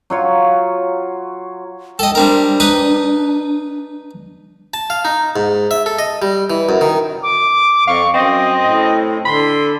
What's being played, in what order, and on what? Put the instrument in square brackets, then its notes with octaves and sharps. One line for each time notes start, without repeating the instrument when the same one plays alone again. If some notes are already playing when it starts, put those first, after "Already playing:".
[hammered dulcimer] F#3 F4 C#5
[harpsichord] A4 D#5 [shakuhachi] G5
[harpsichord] G3 C4 A#4 [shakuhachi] D4
[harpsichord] D#4 B4 D#5
A5
F5
D#4
G#2
E5
A4
D#5
G3
E3
F#2
D#3
[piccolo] D6
[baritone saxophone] F2 [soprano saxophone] F5 [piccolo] C#6
[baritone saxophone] F#2 [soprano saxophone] C4 [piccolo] D#5
[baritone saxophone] A2
[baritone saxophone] D3 [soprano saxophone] B5 [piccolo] C6